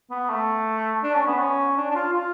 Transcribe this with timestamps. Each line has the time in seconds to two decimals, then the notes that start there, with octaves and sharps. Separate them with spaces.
0.11 B3
0.29 A3
1.03 D4
1.15 C#4
1.27 B3
1.39 C#4
1.77 D4
1.91 D4
1.95 F4
2.13 F4